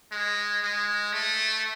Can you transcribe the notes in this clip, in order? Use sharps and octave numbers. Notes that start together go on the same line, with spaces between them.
G#3
G#3
A3